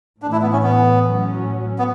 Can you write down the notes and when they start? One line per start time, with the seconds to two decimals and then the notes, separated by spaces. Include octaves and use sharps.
0.22 A2 E3 A3 D4
0.32 E4
0.42 B3
0.53 C#4
0.63 B3
1.03 A2 F#3 C#4
1.79 B3